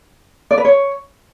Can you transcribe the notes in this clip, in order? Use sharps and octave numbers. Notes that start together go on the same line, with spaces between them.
D5
B4
C#5